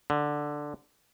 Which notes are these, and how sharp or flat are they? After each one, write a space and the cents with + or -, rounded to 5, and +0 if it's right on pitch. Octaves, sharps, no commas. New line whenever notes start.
D3 +5